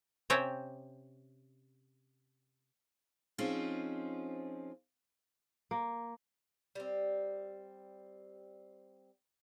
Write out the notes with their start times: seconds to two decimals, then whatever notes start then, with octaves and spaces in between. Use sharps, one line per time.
0.30 C3 C4 C#4 C#5 G5
3.38 F3 C4 C#4 D#4 F4 G#4
5.71 A#3
6.75 G3 C4